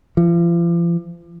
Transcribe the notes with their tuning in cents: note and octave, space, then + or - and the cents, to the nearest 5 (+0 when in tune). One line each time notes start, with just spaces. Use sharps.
F3 -40